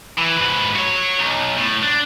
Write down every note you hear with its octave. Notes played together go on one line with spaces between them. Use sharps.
E3
G#2 B4
F#4 C#5
B1
A2
D4